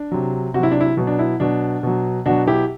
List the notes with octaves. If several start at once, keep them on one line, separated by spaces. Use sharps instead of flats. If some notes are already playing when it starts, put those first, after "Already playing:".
Already playing: D4
C3 F#3
C3 F#3 E4 F#4
D4
E4
B2 F#3
D4
E4
B2 F#3 D4
B2 F#3
B2 F#3 D4 F#4
E4 G4